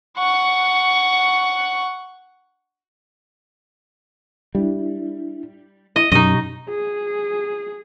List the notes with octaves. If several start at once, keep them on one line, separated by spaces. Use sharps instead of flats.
F#5 C#6
G3 D4 E4
E4 D#5
F#2 B2 D#4 G4 D#5 C#6
G#4